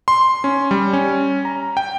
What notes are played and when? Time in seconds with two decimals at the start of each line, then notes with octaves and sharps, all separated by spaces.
0.08 C6
0.44 C#4
0.71 G3
0.93 C#4
1.45 A#5
1.77 G5